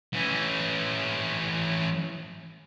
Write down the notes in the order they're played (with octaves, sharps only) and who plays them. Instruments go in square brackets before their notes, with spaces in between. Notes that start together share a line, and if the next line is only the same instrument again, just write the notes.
[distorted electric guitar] E3 C#4